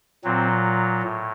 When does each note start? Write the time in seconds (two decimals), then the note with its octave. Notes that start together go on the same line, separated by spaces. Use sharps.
0.24 A#2 F#3 C4
1.03 A2